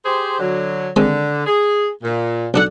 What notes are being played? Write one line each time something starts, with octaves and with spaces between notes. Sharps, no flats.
G4 G#4 C5
D3 F#3
D3 D#3 G#3 C4
G#4
A#2
B1 D4 A4 F#5